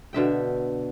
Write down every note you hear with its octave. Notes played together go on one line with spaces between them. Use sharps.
B2 D3 E5 G5